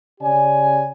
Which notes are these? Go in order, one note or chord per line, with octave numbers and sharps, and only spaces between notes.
C#3 G4 C#5 D5 G#5